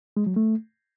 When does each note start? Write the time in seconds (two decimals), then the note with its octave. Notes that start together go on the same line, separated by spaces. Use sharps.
0.17 G#3
0.26 F#3
0.36 A3